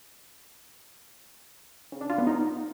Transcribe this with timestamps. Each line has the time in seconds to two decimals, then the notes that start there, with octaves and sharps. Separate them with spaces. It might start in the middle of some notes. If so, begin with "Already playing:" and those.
1.92 C#3
2.01 D4
2.10 F4
2.18 B3
2.27 D#4